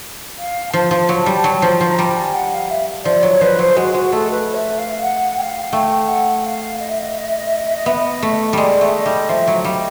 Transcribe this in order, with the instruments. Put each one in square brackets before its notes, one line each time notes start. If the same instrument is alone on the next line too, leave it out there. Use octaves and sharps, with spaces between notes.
[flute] F5
[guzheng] F3 [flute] A5
[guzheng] F3
F#3
G3
F#3
F3
F3
[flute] A#5
[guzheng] G3
[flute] A5
G#5
F#5
F5
E5
[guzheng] F3 [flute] D5
[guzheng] F#3 [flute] C#5
[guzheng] F3 [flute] B4
[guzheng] F#3 [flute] C5
[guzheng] G#3 [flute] F#4
[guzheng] G#3 [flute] F#4
[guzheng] A3 [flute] A4
[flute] B4
E5
F5
F#5
G5
F5
[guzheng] A3 [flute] G5
[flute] F#5
F5
D#5
E5
D#5
E5
D#5
E5
D#5
E5
D#5
E5
D#5
[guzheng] B3 [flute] E5
[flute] D#5
[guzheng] A3
[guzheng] G3 G#3 [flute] D5
[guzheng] A3
[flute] E5
D#5
[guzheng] G3
[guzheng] F3 [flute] E5
[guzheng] F#3
[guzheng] G3 [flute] D#5 F5